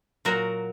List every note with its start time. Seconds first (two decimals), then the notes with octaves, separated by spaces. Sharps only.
0.25 A#2 F#3 F#4 A#4